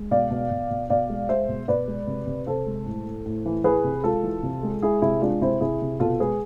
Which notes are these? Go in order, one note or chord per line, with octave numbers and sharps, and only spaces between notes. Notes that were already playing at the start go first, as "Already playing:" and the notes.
Already playing: G#3
B2 D5 F5
B2
B2
B2
B2 D5 F5
G#3
G#3 C5 E5
B2
B2 B4 D5
G#3
C3
C3
C3 A4 C5
G#3
A2
A2
A2
E3
E3 G#4 B4
C3
G#3 F4 A4
E3
C3
G#3
G#3 E4 G#4
C3 E4 G#4
G#3 D4 F4
C3 C4 E4
C3 E4 G#4
C3
B2 F4 A4
G#3 G#4 B4